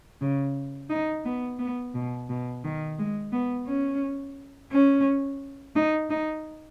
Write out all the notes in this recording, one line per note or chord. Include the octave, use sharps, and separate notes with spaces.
C#3
D#4
B3
B3
B2
B2
D#3
G#3
B3
C#4
C#4
D#4
D#4